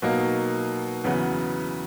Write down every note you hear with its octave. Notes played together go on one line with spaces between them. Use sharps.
B2 F#3 A#3 D#4
E2 C#3 F#3 B3